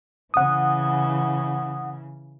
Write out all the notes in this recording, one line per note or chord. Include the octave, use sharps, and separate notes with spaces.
C#3 E3 F#5 D#6